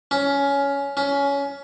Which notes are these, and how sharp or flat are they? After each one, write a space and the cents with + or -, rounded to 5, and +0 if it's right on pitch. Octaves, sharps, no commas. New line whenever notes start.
C#4 +15
C#4 +20